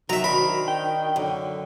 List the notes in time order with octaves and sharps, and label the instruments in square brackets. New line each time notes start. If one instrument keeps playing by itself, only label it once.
[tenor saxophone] D#3 [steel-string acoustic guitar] F#3 [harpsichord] E5 A#5
[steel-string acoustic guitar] D4 C5 [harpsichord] B5
[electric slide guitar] G5
[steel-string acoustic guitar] F#2 [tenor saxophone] D3